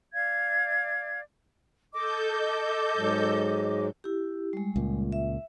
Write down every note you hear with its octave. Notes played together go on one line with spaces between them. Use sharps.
D5 F5 G#6
A4 D#5 D6 G6
G#2 F#3 G#3
E4 G4
G3 G#3
C#2 A#2
E5